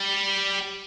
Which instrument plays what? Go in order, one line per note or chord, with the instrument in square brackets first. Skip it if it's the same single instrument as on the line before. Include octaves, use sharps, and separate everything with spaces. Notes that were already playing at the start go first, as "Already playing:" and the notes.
Already playing: [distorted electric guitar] G3